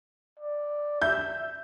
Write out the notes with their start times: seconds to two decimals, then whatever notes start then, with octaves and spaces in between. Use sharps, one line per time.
0.40 D5
1.02 E5 G6